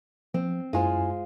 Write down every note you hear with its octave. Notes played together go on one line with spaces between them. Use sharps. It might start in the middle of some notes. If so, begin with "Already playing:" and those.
F3 C4
F#2 G#3 E4 F4 C5 G#5